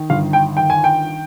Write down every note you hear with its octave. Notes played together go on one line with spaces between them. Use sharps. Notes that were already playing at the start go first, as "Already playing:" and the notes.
Already playing: D#3
G1 F5
G5
D#3 G5
G#5
G5